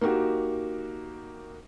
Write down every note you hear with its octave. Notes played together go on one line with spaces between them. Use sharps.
A#3 D#4 F#4 G4